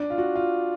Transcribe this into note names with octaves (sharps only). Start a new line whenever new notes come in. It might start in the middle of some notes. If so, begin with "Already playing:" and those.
Already playing: D4
F4
F#4
F4